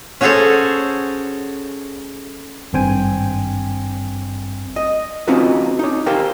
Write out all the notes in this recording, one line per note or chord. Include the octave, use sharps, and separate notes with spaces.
C#4 F#4 G#4 A4 C5 C#5
G#1 G2 C4 C5 G5 G#5
D#5
C4 C#4 D#4 F4 F#4 B4
D#4 C#5
G4 A#4 C5 F5 G5